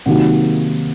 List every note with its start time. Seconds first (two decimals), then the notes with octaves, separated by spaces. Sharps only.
0.06 C3 D#3 F#3 A#3 D#4 F#5